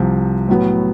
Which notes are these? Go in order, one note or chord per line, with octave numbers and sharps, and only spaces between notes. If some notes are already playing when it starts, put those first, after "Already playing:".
Already playing: C2 C3 F3
A2 F#3 B3